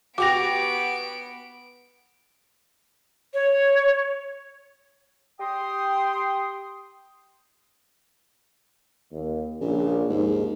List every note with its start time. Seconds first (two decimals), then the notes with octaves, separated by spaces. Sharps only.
0.18 B3 F#4 G4 D6 A#6 D7 F7
3.34 C#5
5.40 G4 G5 C6 D#6
9.12 D#2
9.61 A#1 C#3
10.09 D#2 G#2